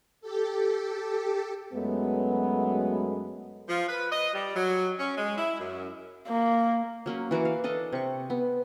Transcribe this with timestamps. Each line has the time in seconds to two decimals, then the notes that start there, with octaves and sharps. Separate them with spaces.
0.21 G4 A4
1.73 F#2 F#3 G#3 A3 B3
3.68 F3
3.89 B4
4.11 D#5
4.33 G3
4.56 F#3
4.99 C#4
5.17 G#3
5.37 E4
5.59 F#2
6.28 A#3
7.06 F#3 A#3 C#4
7.31 E3 F#4 F5 D6
7.45 F5
7.64 D4 A4 D#5 A5
7.92 C3 C#6
8.30 B3